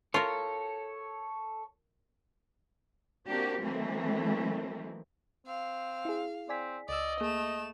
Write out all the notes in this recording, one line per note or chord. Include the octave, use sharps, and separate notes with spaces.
F4 A4 A#4 C#5
A#3 C4 D4 F#4 G4
D#3 E3 F#3 A3 A#3 C4
C4 F5
E4 G#4
C4 D5 G#5 B6
C#2 D5 D#5 E6
A3 A#3 G#4 E7